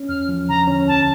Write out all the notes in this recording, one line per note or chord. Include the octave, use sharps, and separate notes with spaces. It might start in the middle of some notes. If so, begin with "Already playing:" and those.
Already playing: C#4
E2 F6
F3
D3 A#5
C#4
D2 A5